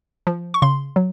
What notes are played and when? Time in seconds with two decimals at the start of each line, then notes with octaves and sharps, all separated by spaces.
0.27 F3
0.54 C#6
0.62 C#3 C6
0.96 F#3